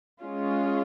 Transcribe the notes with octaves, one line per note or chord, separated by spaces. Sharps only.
G#3 C#4 F4